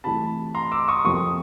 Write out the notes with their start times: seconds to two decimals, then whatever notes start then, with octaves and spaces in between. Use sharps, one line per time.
0.04 C3 E3 A3 A5 B5
0.55 A#5 C6
0.72 D6 E6
0.88 C#6 D#6
1.04 F2 C3 F3 A#3 C#6 D#6